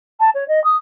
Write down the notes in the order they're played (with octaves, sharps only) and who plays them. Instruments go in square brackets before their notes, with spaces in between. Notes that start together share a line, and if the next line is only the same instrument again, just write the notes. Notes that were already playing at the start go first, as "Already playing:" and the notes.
[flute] A5
C#5
D#5
D#6